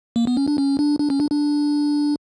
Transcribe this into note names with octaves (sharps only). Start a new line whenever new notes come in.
A#3
B3
C#4
D4
C#4
D4
D4
C#4
D4
D4